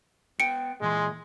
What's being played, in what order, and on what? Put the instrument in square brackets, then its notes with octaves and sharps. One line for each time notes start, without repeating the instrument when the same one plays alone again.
[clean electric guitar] B3 G5 [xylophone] C#7 D7
[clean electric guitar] A#2 E3 C6 [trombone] G#3